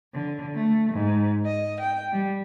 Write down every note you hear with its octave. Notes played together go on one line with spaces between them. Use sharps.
D3
A3
G#2
D#5
G5
G3